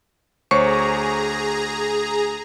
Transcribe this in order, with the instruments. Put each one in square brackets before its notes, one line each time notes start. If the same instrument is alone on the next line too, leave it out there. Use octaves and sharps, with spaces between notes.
[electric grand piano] D2 C#6 [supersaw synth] G#4 A#5 [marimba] C5 C#5